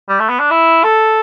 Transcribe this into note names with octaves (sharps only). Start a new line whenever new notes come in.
G3
A3
B3
D4
E4
A4